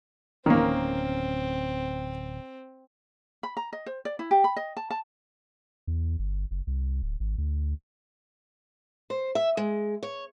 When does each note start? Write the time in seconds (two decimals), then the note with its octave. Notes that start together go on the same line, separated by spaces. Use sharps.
0.46 D1 G1 D#3 A#3 C4 C#4
3.43 B5
3.57 A#5
3.73 D#5
3.86 C5
4.05 D5
4.19 E4
4.31 G4
4.44 B5
4.57 D#5
4.77 A5
4.90 A5
5.87 E2
6.19 G1
6.51 F#1
6.67 C2
7.02 D1
7.20 G#1
7.38 D2
9.10 C5
9.35 E5
9.57 G#3
10.03 C#5